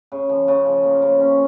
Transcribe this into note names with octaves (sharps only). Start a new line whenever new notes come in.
C#3
F3
C#3
F3
A#3
C#3
C#4